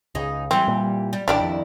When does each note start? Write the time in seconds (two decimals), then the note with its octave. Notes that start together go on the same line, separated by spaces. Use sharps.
0.15 C#2 D#4 G#4
0.51 E3 G3 C4
0.68 A#2
1.13 G3
1.28 A1 D#3 G3 D4 E4 G4 D5
1.41 F2